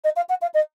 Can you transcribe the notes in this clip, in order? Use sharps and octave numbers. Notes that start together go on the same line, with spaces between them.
D#5
F5
F#5
F5
D#5